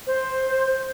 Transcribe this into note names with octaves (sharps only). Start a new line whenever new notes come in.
C5